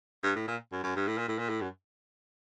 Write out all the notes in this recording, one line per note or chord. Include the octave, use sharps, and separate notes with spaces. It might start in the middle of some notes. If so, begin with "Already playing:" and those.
G2
A2
A#2
F#2
F#2
G2
A2
A#2
A2
A#2
A2
F#2